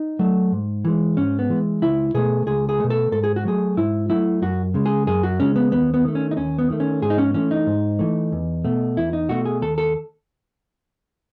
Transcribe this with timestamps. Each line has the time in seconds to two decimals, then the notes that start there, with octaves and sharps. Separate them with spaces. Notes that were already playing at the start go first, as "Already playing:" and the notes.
Already playing: D#4
0.19 F#3 A3
0.52 G#2
0.85 E3 G#3
1.17 G#2 C#4
1.39 B3
1.49 E3 G#3
1.82 C#2 E4
2.14 B2 A3 G#4
2.47 C#2 G#4
2.69 G#4
2.80 B2 A3
2.90 A4
3.12 G#2 A4
3.24 G#4
3.36 F#4
3.45 F#3 A3 G#4
3.77 G#2 E4
4.10 F#3 A3 E4
4.42 F#2 F#4
4.74 C#3 G#3
4.86 G#4
5.07 F#2 G#4
5.23 F#4
5.40 C#3 G#3 C#4
5.56 B3
5.72 D#2 B3
5.94 B3
6.05 D#3 A3
6.15 C#4
6.31 D#4
6.37 D#2 C#4
6.59 B3
6.70 D#3 A3
6.80 C#4
7.02 G#2 G#4
7.10 D#4
7.18 C#4
7.34 E3 A3 C#4
7.51 D#4
7.67 G#2
7.99 E3 A3
8.32 E2
8.64 B2 A3
8.97 E2 E4
9.13 D#4
9.29 B2 A3 F#4
9.46 G#4
9.62 D#2 A4
9.78 A4